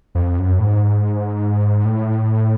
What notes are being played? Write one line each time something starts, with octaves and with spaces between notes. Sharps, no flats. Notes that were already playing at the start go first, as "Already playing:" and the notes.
F2
F#2
A2
G#2
A2